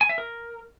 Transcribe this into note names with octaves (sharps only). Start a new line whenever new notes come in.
G#5
E5
A#4